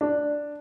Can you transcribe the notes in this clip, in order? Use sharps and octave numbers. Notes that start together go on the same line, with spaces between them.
D4